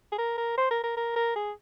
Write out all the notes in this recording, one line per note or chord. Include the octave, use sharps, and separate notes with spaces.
G#4
A#4
A#4
C5
A#4
A#4
A#4
A#4
G#4